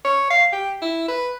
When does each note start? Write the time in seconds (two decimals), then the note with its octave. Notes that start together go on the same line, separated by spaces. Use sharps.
0.05 C#5
0.30 F5
0.53 G4
0.82 E4
1.08 B4